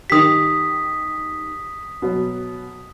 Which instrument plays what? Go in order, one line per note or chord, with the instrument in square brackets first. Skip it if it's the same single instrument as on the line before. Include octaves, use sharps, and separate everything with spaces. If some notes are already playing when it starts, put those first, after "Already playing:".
[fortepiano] D#3 G4 [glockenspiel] D#6 B6
[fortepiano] B2 F#3